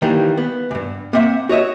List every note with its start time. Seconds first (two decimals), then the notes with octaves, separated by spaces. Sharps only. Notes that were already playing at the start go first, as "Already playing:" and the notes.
0.02 D#3 E3 G3 A#3
0.37 B3
0.71 C#2 G2
1.13 A#3 C4 E5 F#5
1.49 F#4 C#5 D#5 E5